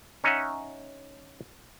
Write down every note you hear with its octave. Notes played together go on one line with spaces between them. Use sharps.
C#4 D#4 C#5 D#5 E5 F#5